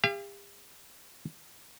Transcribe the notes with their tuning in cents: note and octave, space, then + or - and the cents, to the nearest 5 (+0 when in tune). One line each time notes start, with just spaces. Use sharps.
G4 +45 F5 -35